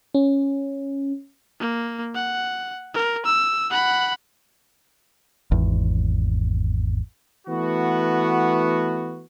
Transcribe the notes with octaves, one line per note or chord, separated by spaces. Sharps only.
C#4
A#3
F#5
A#4
E6
F#5 B5
G#1 E2
E3 A3 B3 F#4